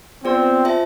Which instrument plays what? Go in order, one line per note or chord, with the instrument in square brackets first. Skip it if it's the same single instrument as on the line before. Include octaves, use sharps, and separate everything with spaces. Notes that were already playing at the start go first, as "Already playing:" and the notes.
[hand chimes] B3 F4 G#4 D5 [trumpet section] C4
[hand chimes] F4 G#4 C5 E5 A5